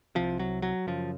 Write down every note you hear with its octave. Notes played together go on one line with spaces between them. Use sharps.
C2 C3 F3
F#3
F#3
F#2 C#3 F3